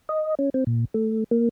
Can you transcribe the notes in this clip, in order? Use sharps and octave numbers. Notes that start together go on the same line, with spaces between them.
D#5
C#4
C4
A#2
A3
A#3